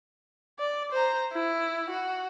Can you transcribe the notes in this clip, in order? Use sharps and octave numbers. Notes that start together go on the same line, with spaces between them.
D5
C5 A#5
E4
F#4